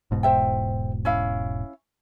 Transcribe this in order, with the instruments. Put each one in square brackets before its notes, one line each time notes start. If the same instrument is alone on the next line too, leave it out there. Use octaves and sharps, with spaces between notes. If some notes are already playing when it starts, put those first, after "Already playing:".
[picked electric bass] E1 G#2 B2
[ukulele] C5 E5 G5
C#4 E4 F5